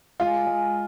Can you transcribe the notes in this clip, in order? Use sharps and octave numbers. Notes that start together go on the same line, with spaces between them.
G#3 F4
G#3